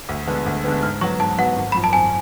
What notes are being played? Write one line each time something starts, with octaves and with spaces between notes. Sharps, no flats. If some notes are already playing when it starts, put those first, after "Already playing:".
D2
D3 G#3 B3
D2
D3 G#3 B3
G#2 F6
F#3 B3 F#4 C#6
G#2 A5
F#3 B3 F#4 F#5
G#1
F#2 F3 B5
A5
G#1 G#5